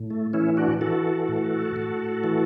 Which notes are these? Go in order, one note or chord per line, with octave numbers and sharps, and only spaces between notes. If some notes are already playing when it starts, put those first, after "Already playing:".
Already playing: A2
A3
E3 C#4 E4
D4 F#4
E3 F#4 A4
A2
A2
E3